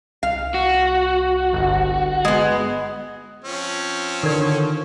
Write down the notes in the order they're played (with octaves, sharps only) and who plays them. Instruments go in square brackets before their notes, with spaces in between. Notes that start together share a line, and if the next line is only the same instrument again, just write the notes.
[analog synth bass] C2 [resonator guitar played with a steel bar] F5
[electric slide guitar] F#4
[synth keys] G1
[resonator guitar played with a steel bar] G#3 B3
[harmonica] F3 C4 C#4
[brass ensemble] D3 C#5 [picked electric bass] D#3 [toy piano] A4 A#4 D5